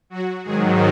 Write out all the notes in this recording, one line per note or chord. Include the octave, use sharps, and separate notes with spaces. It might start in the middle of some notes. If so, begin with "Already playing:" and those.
F#3 F#4
G#2 D#3 F#3 G#3 G#4